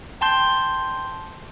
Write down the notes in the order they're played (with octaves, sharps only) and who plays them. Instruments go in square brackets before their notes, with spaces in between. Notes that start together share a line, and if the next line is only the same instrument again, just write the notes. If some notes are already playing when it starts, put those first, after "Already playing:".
[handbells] G5 A5 C6 G6